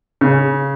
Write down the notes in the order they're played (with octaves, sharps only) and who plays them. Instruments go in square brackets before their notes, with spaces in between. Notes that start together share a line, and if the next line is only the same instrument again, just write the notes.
[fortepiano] C#3